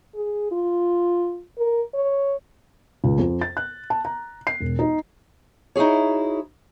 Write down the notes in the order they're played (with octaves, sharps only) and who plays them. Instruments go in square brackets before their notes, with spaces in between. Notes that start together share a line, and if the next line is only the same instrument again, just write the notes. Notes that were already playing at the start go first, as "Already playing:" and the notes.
[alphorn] G#4
F4
A#4
C#5
[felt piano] C#2
F2
A6
F#6
A5
A#5
C7
E1
D#4
[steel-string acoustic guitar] D#4 E4 F#4 G#4 C#5